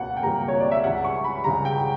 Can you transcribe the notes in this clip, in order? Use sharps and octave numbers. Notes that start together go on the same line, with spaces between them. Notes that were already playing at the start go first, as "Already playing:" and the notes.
Already playing: C#2 B2 A#3 F#5
G5
C#2 B2 G3 A#3 A#5
C#5
D5
E5
C#2 C#3 G3 F#5
C#6
B5
C#2 C#3 G3 A#5
G5